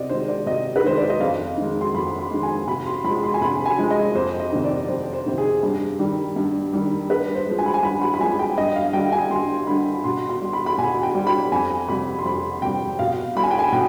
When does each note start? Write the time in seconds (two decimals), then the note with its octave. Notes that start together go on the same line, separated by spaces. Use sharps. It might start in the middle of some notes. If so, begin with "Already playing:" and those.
Already playing: C3 D5 D#5
0.10 D#3 G#3 C5
0.28 D5
0.46 C3 D#5
0.76 B4
0.84 D#3 G#3 C5
0.97 D5
1.10 D#5
1.20 F2 F5
1.57 D#3 G#3
1.81 C6
1.94 F2 B5
2.19 C6
2.31 D#3 G#3
2.43 G#5
2.68 C3 B5
2.86 C6
3.04 F3 G#3 B5
3.23 C6
3.34 G#5
3.41 C3 B5
3.66 G#5
3.78 F3 G#3
3.91 D#5
4.15 F2 C5
4.40 D#5
4.52 C3 D#3
4.65 D5
4.88 F2 C5
5.13 C5
5.26 C3 D#3
5.38 G#4
5.63 G2
5.99 D#3 G3
6.36 G2
6.73 D#3 G3
7.10 G2 B4
7.35 C5
7.47 F3 G#3
7.59 G#5
7.66 B5
7.74 G#5
7.83 G2 B5
8.02 B5
8.14 B5
8.20 F3 G#3 G#5
8.39 G5
8.58 G2 D#5
8.76 F5
8.93 D3 G3 G5
9.12 G#5
9.30 G2 C6
9.67 D3 G3 B5
10.04 B2 C6
10.29 C6
10.41 G3
10.53 B5
10.66 B5
10.78 B2 G#5
11.03 G5
11.15 G3
11.27 B5
11.52 F2 G#5
11.89 C3 G3 B5
12.19 C6
12.25 F2 B5
12.62 C3 G3 G5
12.99 B2 F5
13.35 G3 B5
13.43 G#5
13.51 G5
13.59 G#5
13.73 B2 G5